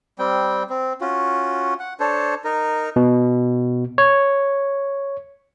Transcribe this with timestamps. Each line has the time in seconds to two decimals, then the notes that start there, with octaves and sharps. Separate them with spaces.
0.19 G3 C4 G5
0.70 C4
1.01 C#4 F4 F#4
1.80 F#5
2.00 D4 A4 C5 C#5
2.44 D#4 A#4
2.96 B2
3.98 C#5